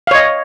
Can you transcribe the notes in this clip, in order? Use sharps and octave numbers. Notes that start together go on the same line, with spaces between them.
C#5 D#5 F5